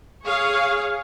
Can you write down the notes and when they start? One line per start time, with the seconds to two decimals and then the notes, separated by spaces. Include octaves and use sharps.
0.24 G#4 C#5 F5